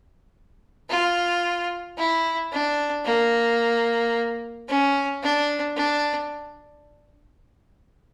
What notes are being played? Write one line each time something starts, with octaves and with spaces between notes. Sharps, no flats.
F4
E4
D4
A#3
C#4
D4
D4